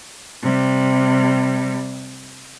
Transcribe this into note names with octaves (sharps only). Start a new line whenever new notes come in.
C3 G3